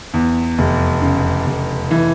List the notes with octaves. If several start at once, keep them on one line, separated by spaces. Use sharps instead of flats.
E2
F1
C#3
F1
E3